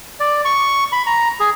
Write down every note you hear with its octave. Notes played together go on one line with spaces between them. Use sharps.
D5
C#6
B5
A#5
G#4